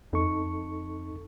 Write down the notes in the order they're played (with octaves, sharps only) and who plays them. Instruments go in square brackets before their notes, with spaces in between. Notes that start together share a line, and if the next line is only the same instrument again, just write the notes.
[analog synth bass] F2 [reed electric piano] D#4 A4 C#6